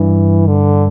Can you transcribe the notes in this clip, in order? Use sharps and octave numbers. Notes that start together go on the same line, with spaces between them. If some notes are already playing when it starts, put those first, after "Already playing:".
Already playing: G2 E3
D3